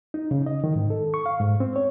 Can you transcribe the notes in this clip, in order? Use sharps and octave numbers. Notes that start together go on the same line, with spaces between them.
D#4
C#3
D#5
D#3
G#2
A4
C#6
F5
G#2
C4
C#5